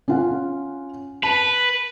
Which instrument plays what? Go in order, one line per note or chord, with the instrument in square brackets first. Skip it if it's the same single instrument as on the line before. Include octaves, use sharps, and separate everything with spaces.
[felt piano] C#4 F4 F#5
[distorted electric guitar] B4 [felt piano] A5